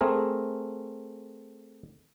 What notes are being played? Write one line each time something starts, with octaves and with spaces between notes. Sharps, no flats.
A3 C4 G#4 A#4